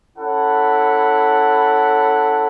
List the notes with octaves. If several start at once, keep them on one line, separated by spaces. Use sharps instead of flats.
C#4 E4 A4 F#5